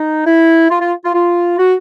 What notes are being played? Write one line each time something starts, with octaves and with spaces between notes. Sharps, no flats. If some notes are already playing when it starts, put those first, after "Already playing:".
Already playing: D#4
E4
F4
F4
F4
F4
F#4